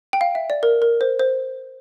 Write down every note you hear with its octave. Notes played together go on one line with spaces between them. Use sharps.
G5
F5
E5
D5
A#4
A#4
C5
C5